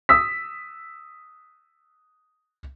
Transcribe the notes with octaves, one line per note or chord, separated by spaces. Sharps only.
D#6 E6 B6